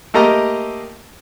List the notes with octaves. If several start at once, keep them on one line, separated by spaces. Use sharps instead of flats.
A3 A#3 G4 D#5 A#5